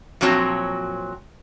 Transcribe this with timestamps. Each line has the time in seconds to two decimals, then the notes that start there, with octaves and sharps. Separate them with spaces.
0.21 A#2 F3 F#3 C4 F#4 C#5